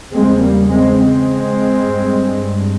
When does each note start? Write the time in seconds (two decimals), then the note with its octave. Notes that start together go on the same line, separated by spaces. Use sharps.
0.13 E2 C#3 G#3 C4
0.41 G3 A#3
0.70 G#3 C4
0.97 G#3 C4
1.81 G2